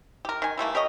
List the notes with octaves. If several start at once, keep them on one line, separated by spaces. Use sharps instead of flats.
G4 A#4
D#3 G#5
E3 G3 A3 A#3
G4 A#4 C#5 D#5